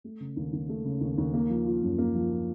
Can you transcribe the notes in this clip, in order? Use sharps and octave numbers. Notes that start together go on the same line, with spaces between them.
A3
C#3
D#2
D#2
A3
C#3
D#2
D#2
A#3
F3
F4
F#2
A#3
F3
F4